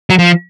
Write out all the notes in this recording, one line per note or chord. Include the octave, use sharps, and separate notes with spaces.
F#3
F3